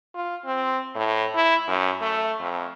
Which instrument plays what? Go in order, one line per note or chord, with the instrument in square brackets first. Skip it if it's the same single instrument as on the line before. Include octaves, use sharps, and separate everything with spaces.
[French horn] F4
C4
A2
E4
F#2
A3
F2